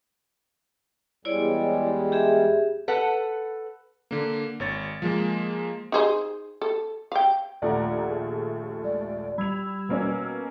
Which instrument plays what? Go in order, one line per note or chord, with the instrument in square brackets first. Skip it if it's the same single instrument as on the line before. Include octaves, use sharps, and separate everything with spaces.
[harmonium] E2 G3 G#3 [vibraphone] E4 C#5 D5
[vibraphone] G4 G#4 E5
[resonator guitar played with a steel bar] A4 B4 F#5
[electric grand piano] D3 A#3
G#1 C#5 A6
F3 G#3 A#3
[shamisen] D#4 G#4 C5
A4
F5 G5
[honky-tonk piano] A#1 D#2 A3 [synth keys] D5 F#5 A#5
[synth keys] G#4
[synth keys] G#3 [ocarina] D5
[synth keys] G3 G#6 [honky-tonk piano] B5 F7 [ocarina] E6
[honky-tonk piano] B2 A#3 C#4